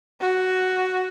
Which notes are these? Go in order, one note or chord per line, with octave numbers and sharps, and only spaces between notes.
F#4